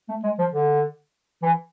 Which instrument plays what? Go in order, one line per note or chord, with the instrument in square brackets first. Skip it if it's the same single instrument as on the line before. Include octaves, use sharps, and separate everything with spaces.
[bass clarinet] A3
G#3
F3
D3
E3